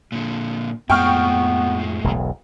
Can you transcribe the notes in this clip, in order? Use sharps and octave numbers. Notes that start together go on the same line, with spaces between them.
A#2 D3
F2 A2 G#3 B3 G5 C#6 F6
E1 B1 E2